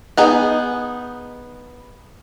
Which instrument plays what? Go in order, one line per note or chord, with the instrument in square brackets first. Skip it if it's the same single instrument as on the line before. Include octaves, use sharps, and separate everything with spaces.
[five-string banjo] B3 D#4 G#4